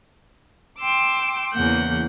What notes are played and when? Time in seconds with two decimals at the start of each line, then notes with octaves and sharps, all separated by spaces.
0.78 G5 C6 D6 E6
1.52 E2 C#3 E3 A#3 F#5 G6